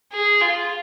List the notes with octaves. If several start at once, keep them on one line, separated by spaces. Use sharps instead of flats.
G#4
F4